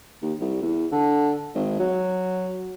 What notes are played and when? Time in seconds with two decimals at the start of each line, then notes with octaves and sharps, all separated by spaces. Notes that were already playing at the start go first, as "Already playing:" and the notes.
0.22 D#2
0.40 C2
0.62 E2
0.92 D3
1.55 G#1
1.79 F#3